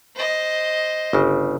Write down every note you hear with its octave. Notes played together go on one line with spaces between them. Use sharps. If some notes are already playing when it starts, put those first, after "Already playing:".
C5 D#5
G1 C#3